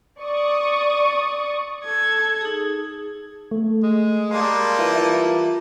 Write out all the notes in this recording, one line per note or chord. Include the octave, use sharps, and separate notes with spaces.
D5 C#6 D#6
A4 G#6
D#4 G#4
A3
G#3
G3 A#3 A5 C6
E3 F4
E3